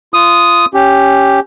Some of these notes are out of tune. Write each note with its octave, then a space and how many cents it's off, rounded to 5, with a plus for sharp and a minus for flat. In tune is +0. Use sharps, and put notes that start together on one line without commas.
F4 -25 D#6 +0
C#4 +0 G4 +0